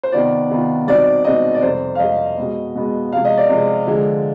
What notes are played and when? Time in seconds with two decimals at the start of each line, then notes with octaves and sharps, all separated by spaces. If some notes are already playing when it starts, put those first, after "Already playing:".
0.03 C5
0.12 C3 D#3 B3 F4 D5
0.50 C3 D#3 B3 F4
0.87 B2 G3 C4 D#4 D5
1.24 B2 G3 C4 D#4 D#5
1.55 D5
1.62 F2 C3 G3 C5
1.95 F5
1.99 F2 C3 G3 D#5
2.37 B2 G#3 B3
2.75 B2 G#3 B3
3.12 C3 F3 G#3 F5
3.25 D#5
3.38 D5
3.49 C3 F3 G#3
3.87 D3 F3 G#3